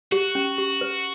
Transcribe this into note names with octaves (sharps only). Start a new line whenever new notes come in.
F#4 G4
C#4
G4
B4